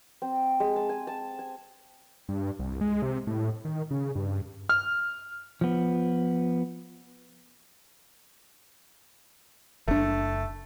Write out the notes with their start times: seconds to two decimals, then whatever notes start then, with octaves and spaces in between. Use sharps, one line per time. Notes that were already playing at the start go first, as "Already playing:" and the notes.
0.22 C4
0.60 G#3
0.76 A5
0.89 G#5
1.07 A5
1.39 G#5
2.29 G2
2.59 C2
2.81 G#3
3.02 C3
3.27 A2
3.65 D#3
3.91 C#3
4.15 G2
4.69 F6
5.61 F3 B3
9.88 F#1 A3 D4